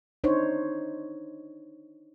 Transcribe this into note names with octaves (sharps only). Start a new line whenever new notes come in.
D4 D#4 C5 C#5